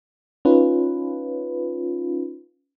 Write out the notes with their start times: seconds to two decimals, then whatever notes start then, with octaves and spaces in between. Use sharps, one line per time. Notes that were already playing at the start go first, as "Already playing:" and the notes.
0.45 C#4 D#4 F4 B4